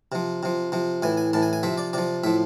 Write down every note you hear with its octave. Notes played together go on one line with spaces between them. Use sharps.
C3 F3
C3 F3
C3 F3
A2 E3 G#5
G#5
A2 E3 A5
G#5
G#5
C3 F3 E5
D5
C3 F3 D5
A2 F3 E5